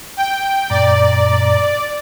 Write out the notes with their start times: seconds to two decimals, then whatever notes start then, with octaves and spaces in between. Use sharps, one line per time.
0.17 G5
0.70 F#2 A#2 D5 A#5